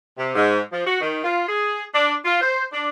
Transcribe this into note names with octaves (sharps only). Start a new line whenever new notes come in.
C3
G#2
F3
F#4
D#3
F4
G#4
D4
F4
C5
D4